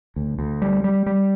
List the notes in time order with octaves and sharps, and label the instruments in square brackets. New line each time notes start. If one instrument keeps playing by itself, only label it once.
[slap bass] D2
D2
G3
G3
G3